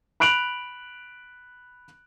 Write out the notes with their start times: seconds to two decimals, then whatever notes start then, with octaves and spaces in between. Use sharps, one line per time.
0.20 B5 F#6 D7 F7 F#7